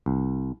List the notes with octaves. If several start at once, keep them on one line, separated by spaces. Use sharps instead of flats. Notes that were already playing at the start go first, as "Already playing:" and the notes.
C2